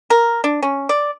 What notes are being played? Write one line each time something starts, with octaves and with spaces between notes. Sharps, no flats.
A#4
D4
C#4
D5